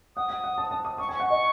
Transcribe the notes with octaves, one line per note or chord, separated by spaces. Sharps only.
F#5 D#6
F#5
F#5
A5
A5
D#6
C#6 D#6
G#5 C#6
F#5
D#5 C#6